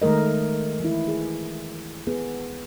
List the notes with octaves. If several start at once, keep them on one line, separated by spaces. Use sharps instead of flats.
D#3 G#3 A3 A#4 D#5
E3 E4
G#4
B3 G#4